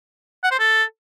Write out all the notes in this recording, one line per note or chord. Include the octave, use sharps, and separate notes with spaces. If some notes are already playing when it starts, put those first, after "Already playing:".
F#5
C5
A4